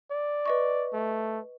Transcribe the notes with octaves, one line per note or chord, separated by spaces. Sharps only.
D5
B4 D#5 C#6
A3